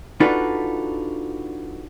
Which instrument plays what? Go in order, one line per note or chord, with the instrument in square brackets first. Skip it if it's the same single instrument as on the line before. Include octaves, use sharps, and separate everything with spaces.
[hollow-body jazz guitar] D4 D#4 F4 F#4 A4 B4